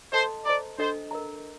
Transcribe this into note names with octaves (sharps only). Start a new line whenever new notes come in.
A4 C5 D#5 A5 C6
C5 D5 D#5 A#5
D4 A4 C5 D#5
A#4 D#5 A#5